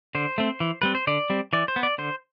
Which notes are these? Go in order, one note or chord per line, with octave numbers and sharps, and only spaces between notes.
D3 C5
A3 C4
E3
G3 C4 B4
C5
D3 D5
G3 C4
E3 D5
C5
B3
D5
D3 C5